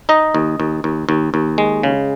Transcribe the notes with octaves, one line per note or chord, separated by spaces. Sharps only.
D#4 D#5
D#2
D#2
D#2
D#2
D#2
G#3
C#3